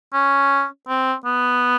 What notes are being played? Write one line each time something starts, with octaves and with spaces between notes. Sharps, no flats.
C#4
C4
B3